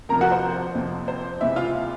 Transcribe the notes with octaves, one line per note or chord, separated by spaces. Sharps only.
F2 C3 F3 A#4 A#5
F#4 F#5
C5
F2 C3 F3
C5
C#2 C3 E3 E4 E5
F4 F5